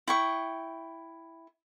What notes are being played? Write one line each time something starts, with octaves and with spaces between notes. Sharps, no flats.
E4 G5 C#6 D#6